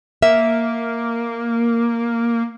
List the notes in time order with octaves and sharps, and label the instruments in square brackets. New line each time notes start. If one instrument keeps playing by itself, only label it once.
[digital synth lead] A#3 [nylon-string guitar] E5